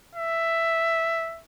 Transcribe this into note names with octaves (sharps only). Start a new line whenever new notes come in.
E5